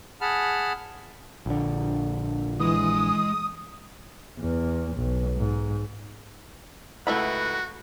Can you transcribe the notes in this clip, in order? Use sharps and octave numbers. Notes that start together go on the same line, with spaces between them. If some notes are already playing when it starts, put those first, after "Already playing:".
G#4 F#5 A5 B5 F6
A#1 D3
E3 G#3 D#6
E2
B1
G#2
C#2 A3 E4 F#4 B4 F#5 B5